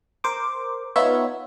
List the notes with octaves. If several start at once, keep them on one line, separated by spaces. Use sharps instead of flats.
A#4 C5 D6
B3 D#4 F4 C#5 E5